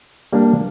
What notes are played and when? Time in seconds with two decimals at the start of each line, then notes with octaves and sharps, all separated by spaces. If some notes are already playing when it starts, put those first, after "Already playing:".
0.33 G3 A#3 D4